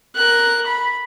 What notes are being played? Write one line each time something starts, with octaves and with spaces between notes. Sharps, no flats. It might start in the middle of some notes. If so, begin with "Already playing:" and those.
A#4 F#6
B5